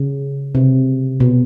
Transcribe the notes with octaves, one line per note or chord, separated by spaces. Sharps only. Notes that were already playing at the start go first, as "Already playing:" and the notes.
Already playing: C#3
C3
B2